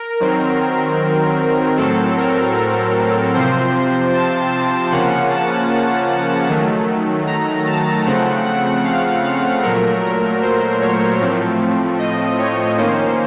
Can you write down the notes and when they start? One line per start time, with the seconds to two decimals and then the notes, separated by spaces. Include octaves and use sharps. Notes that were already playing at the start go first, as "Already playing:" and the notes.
Already playing: A#4
0.20 D#3 F#3 C4
1.77 A2 F#3 C4 A4
2.16 A#4
2.56 A#4
3.34 C3 F3 C4 C5
4.13 A5
4.52 A5
4.91 C#3 F3 A#3 C#4 F#5
5.30 A5
6.49 D#3 F#3 A3
7.27 A#5
7.66 A5
8.05 C#3 F3 A3 C4 F#5
8.45 F#5
8.84 F5
9.23 F5
9.63 A#2 F#3 A3 A#4
10.03 A#4
10.42 C5
10.81 C#5
11.20 A2 F3 A3 C4
11.99 D#5
12.38 C#5
12.77 D#3 A#3 C#4 C5